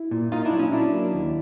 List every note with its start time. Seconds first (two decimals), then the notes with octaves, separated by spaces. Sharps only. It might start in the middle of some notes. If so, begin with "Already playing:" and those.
Already playing: E4
0.11 A#2
0.32 A#2 D#4 F4
0.45 D4 E4
0.53 F#3
0.59 C#4 D#4
0.72 F#3 D4 E4
0.93 A#3
1.14 D#2